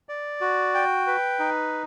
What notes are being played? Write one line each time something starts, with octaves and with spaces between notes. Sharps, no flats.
D5
F#4
G5
B4
D#4